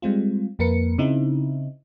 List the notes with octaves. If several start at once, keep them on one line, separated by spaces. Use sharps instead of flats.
G3 G#3 C4 F4
F2 A#3 A#4 B4 C#7
C#3 C4 D#4 E4